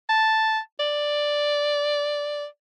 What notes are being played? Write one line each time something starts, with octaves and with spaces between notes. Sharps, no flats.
A5
D5